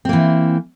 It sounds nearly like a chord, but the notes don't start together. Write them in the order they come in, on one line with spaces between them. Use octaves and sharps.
C4 A#3 E3